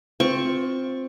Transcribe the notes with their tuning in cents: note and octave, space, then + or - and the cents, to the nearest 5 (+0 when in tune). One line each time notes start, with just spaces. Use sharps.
C4 +5 F4 +15 C#6 +0